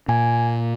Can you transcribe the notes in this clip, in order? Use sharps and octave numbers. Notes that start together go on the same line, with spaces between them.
A#2 G#5